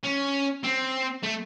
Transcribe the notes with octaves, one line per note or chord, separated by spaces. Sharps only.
C#4
C4
A3